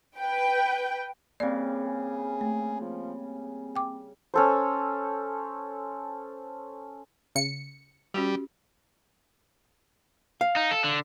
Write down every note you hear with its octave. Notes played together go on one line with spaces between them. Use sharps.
B4 G5
C#3 G3 A#3 C4 D5
G#4
A3
F3
G#4
G5 D6
C#4 A4 C5
C#3 C#7
G3 C#4 F#4 G4
F5
D#4
A4
D3